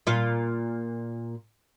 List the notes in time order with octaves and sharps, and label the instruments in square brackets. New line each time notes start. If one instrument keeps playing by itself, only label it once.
[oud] A#2 F4